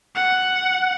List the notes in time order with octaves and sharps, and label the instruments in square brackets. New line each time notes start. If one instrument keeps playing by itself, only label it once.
[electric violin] F#5